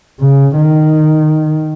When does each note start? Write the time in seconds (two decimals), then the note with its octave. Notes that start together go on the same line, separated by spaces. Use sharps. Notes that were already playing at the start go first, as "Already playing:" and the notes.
0.21 C#3
0.57 D#3